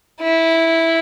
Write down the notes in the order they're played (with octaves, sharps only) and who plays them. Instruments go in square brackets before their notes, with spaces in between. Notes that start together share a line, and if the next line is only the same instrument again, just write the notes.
[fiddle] E4